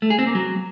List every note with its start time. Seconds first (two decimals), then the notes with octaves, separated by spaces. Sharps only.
0.02 A3
0.10 G#4
0.19 C4
0.27 A#3
0.35 F#3